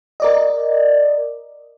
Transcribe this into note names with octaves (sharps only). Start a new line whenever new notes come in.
A#4 D5 D#5